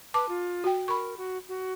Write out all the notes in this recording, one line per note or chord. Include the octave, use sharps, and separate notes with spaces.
B4 A5 D6
F4
F#4 G5
A#4 B5 C#6
F#4
F#4